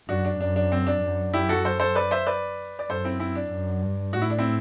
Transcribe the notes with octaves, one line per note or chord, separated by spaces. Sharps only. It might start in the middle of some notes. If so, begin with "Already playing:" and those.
F#2 D4 F#4
D4
F#2 D4
D4
C4
D4
F#2
E4 G4
F#4 A4
A4 C5
A4 C5
B4 D5
C5 E5
B4 D5
D5
F#2 A4 C5
C4 E4
C4 E4
D4
F#2
G2
A2 F#4
E4
D4
C4 E4